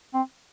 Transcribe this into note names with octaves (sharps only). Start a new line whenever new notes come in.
C4